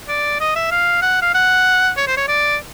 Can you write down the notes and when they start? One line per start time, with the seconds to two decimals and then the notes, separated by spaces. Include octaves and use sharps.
0.09 D5
0.40 D#5
0.56 E5
0.71 F5
1.02 F#5
1.22 F5
1.34 F#5
1.97 C#5
2.07 C5
2.17 C#5
2.28 D5